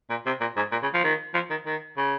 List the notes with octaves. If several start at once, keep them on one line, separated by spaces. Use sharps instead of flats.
A#2
C3
A#2
G#2
A#2
C#3
F3
D#3
F3
D#3
D#3
C#3